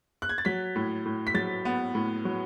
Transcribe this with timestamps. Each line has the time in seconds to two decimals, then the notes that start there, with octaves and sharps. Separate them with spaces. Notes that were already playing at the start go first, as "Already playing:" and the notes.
0.22 F#6
0.29 G#6
0.38 A6
0.45 F#3 B6
0.76 A2
1.06 A2
1.27 B6
1.34 F#3 A6
1.65 B3
1.95 A2
2.25 F#3